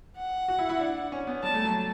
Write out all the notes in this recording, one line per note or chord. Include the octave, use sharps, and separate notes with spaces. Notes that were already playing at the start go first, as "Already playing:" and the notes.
F#5
F#4
E4
E4
D4
C#4
B3
G3 A5
A3
F#3